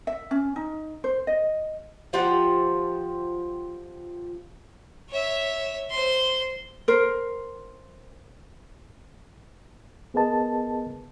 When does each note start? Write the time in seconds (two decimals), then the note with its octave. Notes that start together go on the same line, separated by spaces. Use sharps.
0.07 E5
0.31 C#4
0.56 D#4
1.04 C5
1.27 D#5
2.13 F3 F4 G4 F#5
5.09 C#5 E5
5.90 C5 C6
6.88 A#4 C5
10.14 B3 G#4 A#4 B4 D#5 A5